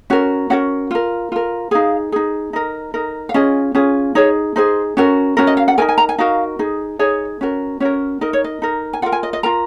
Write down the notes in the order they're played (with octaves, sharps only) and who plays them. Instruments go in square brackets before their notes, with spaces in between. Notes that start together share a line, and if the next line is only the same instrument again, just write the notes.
[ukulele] C#4 F#4 A#4
C#4 F#4 A#4 F#5
F4 A#4
F4 A#4
D#4 G#4 F5
D#4 G#4
D#4 A#4
D#4 A#4
F5
C#4 F4 G#4 D#5
C#4 F4 G#4
D#4 G#4 C#5
D#4 G#4 C5
C#4 F#4 A#4
C#4 F#4 A#4
D#5
F5
F#5
D#4 F#4 A#4 G#5
G#5
A#5
G#5
D#4 F#4 A#4 F5
D#4 G#4
D#4 G#4 C#5
C#4 F#4 A#4
C#4 F#4 A#4 C#5
D#4 A#4 D#5
C#5
D#5
D#4 A#4
G#5
F4 A#4 F#5
G#5
D#5
D#5
F4 A#4 A#5